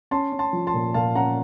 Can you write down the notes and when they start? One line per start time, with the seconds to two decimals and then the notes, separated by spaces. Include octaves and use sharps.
0.11 C#4 A5 C6
0.32 C#4
0.39 A5 C6
0.53 F3
0.67 A5 C6
0.74 A#2
0.94 A#2 F5 A5
1.15 C#4 F#5 A#5